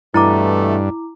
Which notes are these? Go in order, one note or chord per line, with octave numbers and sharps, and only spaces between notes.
G2 B2 E3 A3 E4 A#5 D6